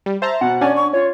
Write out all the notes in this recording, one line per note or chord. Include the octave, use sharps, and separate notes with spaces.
G3
C5 E5 A5 A#5
B2 F#5
C#4 D4 C#5 D5 F#5 G#5
C#6
F4 C#5